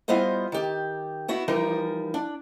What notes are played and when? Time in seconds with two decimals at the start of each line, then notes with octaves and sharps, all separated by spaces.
0.08 G3 B3 E4 F4 C5 D#5
0.52 D#3 G4
1.28 B3 E4 F#4
1.48 E3 F3 G3 D#4 A#4
2.14 D4